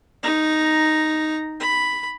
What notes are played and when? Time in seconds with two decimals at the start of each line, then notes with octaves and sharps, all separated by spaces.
0.23 D#4 A#5
1.60 B5